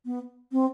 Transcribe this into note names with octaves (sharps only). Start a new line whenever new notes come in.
B3
C4